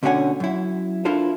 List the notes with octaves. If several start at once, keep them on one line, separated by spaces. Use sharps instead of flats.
D2 B2 D3 C#4 F#5 G#5
F#2 E4
D4 E4 F4 A4 A#4 C5